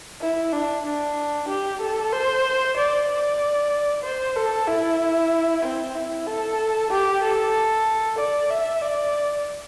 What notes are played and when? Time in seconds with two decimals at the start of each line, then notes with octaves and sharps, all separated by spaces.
0.21 E4
0.53 D4
0.85 D4
1.48 G4
1.81 A4
2.12 C5
2.77 D5
3.08 D5
4.03 C5
4.36 A4
4.67 E4
5.63 C4
5.95 E4
6.27 A4
6.91 G4
7.22 A4
8.19 D5
8.50 E5
8.82 D5